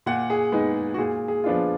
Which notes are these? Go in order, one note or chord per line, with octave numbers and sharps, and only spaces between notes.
A#2 F#5
G#4
G#3 B3 D#4
F#4
A#2 G#4
G#4
F3 B3 D4 F4